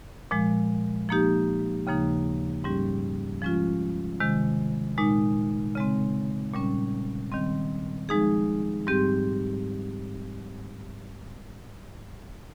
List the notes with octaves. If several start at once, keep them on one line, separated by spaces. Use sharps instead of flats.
A#2 F3 G#3
F3 A#3 D#4 G4
D#2 C#3 F3 A#3 D#4
G#2 G3 C#4 G4
F3 G#3 C#4 F4
C3 D#3 G#3
A#2 G#3 D#4
C#3 G#3 C4
A#2 G3 C#4
D#3 G3 C4
F3 G#3 D#4 G#4
G#2 G3 C4 G4